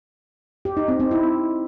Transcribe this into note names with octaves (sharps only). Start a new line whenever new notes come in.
G4
D#4
C4
C4
E4